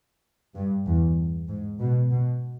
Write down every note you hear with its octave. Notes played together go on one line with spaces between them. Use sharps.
G2
E2
G#2
B2
B2